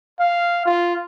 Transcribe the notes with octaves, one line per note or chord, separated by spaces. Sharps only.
F5
F4